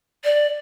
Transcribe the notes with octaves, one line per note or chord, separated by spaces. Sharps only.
D5